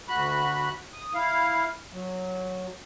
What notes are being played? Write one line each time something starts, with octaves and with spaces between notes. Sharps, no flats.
D2 F#4 B5 F#6
D#6
E4 F5
F#3